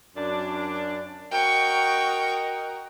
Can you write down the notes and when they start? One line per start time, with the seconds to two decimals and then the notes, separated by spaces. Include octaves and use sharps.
0.16 F#2 D4
1.32 F#4 A#4 D#5 G5 C#6